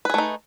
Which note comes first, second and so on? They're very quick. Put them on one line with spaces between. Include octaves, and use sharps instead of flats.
B4 G#4 A3 D#4